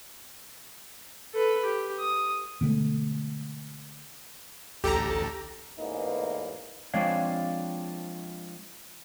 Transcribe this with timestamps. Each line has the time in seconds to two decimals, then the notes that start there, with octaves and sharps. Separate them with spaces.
1.34 A4 B4
1.64 G4
2.00 D#6
2.61 B2 D3 G#3 A3
4.84 A1 D2 G4 A4 A#5
5.79 A1 E2 G#2 A#3 D#4 B4
6.94 F3 G#3 C4 D4 C#5 F5